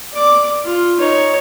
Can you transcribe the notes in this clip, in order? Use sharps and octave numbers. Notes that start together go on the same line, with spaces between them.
D5 D6
F4
D#4 C#5